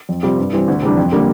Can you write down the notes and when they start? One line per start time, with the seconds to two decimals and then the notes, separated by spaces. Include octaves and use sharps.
0.09 F2
0.23 C3 G3 C4 F4
0.38 G2
0.53 E3 G3 C4
0.68 D2
0.82 C3 E3 G3 D4
0.97 F2
1.12 D3 G3 A#3